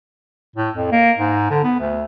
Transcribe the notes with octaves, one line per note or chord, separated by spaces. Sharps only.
A2
F2
A#3
G#2
D3
B3
D2